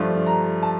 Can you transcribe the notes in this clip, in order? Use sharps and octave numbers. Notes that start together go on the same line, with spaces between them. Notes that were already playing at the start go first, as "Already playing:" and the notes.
Already playing: G2 F3 A3 D4 F4
A#5
A5